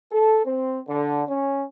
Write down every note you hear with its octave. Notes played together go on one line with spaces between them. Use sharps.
A4
C4
D3
C#4